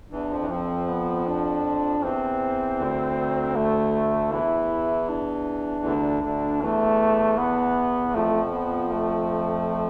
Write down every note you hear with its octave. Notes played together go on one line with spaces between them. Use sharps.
E2 E3 D4
F2 F3
E3
F2 F3 C4
B3
D4
E2 E3 C4
D2 D3
A3
E2 E3 E4
D4
D2 D3
D2 D3
E2 E3 A3
B3
E3
F2 F3 A3
B3
A3